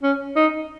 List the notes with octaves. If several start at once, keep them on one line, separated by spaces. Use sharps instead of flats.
C#4
D#4